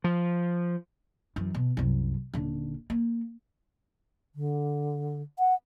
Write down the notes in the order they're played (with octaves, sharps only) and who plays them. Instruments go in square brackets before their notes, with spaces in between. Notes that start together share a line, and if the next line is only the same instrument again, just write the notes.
[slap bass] F3
[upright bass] F#2 E3
B2
C2 F#2
D#1 D3
A#3
[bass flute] D3
F#5